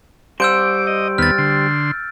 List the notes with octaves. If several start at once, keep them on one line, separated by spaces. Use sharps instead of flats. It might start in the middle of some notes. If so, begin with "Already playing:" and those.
G3 C5 E6 G6 D7
D6
D#5
D#2 B3 F6 A6
D3 C6